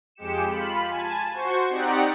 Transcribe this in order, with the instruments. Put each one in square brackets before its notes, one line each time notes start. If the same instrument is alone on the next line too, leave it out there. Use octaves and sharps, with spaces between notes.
[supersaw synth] F2 G#3 G4 C#7 E7
F4 B5
G#5 A5
F#4 C5 C#6
C4 D#4 G4 D5 F#5 C#7